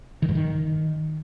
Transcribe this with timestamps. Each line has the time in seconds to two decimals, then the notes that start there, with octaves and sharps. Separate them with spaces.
0.22 D#3
0.29 G2
0.35 D#3